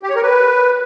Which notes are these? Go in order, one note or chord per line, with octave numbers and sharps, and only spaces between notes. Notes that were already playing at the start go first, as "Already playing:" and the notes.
G4
C#5
A#4
B4